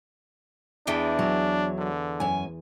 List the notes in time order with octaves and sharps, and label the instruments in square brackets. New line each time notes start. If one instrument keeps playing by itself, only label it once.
[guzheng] E2 E3 G5 [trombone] D4
[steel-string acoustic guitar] F#3
[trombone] D3
[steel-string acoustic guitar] F#2 G#5